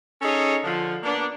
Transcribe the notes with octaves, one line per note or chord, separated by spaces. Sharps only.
C#4 D#4 G#4 A4 C#5
D3 F3
A#3 B3 D4